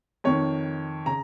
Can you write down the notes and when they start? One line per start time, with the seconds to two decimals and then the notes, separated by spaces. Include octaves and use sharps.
0.24 F2 D#3 C#5
1.06 C#3 A#5